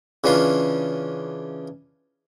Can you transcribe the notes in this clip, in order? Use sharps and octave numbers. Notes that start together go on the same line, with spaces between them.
C#3 E3 C#4 D4 F4 C6